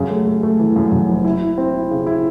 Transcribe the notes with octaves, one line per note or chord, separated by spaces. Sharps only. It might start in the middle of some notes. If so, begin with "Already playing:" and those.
Already playing: F#2 C#3
A3
A3
A3
E3
F#2
F#2
F#1
E4
E4
C4
E4
C#3
E4